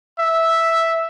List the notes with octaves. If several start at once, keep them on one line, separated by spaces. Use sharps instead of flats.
E5